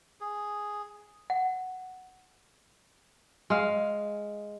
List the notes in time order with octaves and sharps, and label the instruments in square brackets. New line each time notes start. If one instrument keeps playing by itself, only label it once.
[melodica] G#4
[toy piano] F#5
[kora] G#3 F5